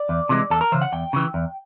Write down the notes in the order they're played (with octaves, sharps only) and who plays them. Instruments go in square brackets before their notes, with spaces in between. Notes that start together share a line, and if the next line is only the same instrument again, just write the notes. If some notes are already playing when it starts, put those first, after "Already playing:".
Already playing: [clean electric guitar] D5
E2
C3 E3 G#3
E2 A4
A#4
C#3 E3 C5
F#5
E2 G5
C#3 E3
E2